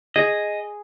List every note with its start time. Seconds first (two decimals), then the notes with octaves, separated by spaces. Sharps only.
0.16 G#4 D#5